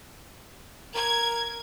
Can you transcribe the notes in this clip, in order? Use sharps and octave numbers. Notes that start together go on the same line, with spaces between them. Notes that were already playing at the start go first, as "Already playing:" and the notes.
A#4 G#6